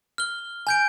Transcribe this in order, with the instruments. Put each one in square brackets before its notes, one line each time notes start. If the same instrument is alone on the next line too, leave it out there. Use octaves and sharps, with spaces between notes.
[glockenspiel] F6 G7
G#5 G6 D7